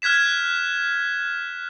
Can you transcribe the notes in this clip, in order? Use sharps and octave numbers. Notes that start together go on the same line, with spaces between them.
F6 F#6 G#6 B6 E7